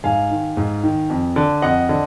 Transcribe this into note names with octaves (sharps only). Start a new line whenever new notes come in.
G#2 F5 G#5
D#3
G#2
D#3
F2
D3
F2 D#5 F#5
D3